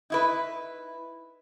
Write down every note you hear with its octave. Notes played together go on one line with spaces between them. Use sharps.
D#4 E4 B4